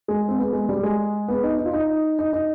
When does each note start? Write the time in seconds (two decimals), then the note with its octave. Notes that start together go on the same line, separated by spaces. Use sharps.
0.08 G#3
0.28 C4
0.38 B3
0.53 G#3
0.69 G3
0.83 G#3
1.28 B3
1.43 D#4
1.58 D#4
1.66 F4
1.73 D#4
2.19 D#4
2.33 D#4